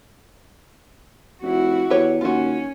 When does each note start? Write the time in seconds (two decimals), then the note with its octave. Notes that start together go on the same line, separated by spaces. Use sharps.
1.42 F1 E4 F#4
1.90 E2 G4 B4 C#5
2.21 D#2 C#4 F4 F#4